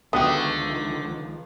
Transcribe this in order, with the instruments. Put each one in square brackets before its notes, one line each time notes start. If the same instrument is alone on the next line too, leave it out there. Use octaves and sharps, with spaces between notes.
[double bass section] C#2 D#3 F3 [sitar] D3 A3 [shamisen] B3 F#4 G4